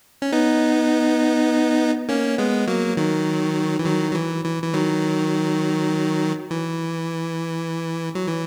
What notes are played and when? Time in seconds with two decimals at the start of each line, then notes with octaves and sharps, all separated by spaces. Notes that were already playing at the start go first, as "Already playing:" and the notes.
0.22 C#4
0.32 B3 D#4
2.09 A#3 C#4
2.38 G#3 B3
2.67 F#3 A#3
2.97 D#3 F#3
3.79 E3
3.86 D#3 F#3
4.11 F#3
4.15 E3
4.44 E3
4.63 E3
4.74 D#3 F#3
6.51 E3
8.15 F#3
8.27 E3